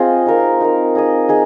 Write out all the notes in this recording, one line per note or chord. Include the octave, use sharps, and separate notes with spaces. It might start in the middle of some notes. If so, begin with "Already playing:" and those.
Already playing: C4 F4 G#4 D#5
D#4 A#4 F5
D#4 A#4 F5
D#4 G#4 D#5
D#4 G#4 D#5